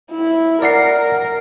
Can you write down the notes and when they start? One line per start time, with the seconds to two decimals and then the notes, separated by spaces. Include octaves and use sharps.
0.11 E4
0.62 A#4 D5 F#5 C7